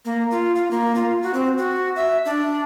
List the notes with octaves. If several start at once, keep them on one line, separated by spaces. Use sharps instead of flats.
A#3
F4
F4
A#3
F4
F#4
C4
F#4
E5
D4